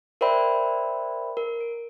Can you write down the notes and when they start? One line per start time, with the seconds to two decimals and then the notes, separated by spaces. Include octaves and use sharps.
0.21 A#4 C5 D5 E5 G5 B5
1.37 A#4
1.61 D7